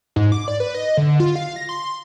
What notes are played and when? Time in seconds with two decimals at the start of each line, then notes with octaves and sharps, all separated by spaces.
0.16 G#2
0.32 D6
0.48 D5
0.60 B4
0.74 D#5
0.97 D3
1.20 F4
1.36 F5
1.56 A#6
1.69 C6